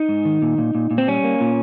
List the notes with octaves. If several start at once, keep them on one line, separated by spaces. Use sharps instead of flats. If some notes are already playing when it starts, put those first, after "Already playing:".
Already playing: D#4
G#2
D#3
A#2
A#2
A#2
A#2
C4
G3 C#4
A#3
A#2